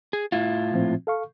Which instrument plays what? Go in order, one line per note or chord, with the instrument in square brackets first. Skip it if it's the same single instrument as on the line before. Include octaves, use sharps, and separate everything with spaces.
[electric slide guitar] G#4
A2 E4 F4
[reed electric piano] A#2 F3 C4
A4 F5 C#6